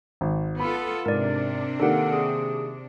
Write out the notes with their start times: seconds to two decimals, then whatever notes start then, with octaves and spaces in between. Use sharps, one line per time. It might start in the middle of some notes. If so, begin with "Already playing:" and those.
0.21 G#1
0.60 B3 F4 A4 B5
1.05 G#2 C3 D4 A#4 D5
1.80 D#3 A#3 G4 A4 A#4 F#5
2.13 G#4